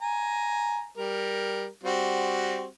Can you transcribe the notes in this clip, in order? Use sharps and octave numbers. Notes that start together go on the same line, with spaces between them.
G#5 A#5
G3 A#4
G3 C4 F#4